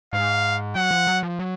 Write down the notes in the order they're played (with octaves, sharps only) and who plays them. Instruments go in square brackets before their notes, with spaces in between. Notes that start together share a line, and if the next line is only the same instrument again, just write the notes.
[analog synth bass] G#2 [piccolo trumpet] F5
[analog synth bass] F#3 [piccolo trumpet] F#5
[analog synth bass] F3
F#3
F3
F#3